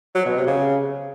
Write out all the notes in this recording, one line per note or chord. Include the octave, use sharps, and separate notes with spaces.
F#3
B2
C3
C#3